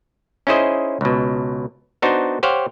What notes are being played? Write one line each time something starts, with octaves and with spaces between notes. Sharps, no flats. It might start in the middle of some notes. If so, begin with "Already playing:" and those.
C#4 D#4 E4 G#4 C5 D#5
C#2 B2
B3 D4 D#4 F#4 C5
G4 C5 C#5 F5 F#5